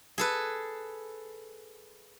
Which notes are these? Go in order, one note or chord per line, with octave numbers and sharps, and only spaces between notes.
G#4 A4 B4